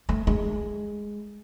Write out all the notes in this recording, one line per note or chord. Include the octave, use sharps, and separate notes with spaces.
A3
G#3